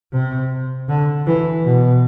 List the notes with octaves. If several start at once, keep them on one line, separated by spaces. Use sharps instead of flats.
C3
D3
E3
B2